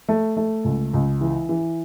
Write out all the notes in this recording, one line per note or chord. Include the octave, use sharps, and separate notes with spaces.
A3
A3
C#2
C#2
E3
E3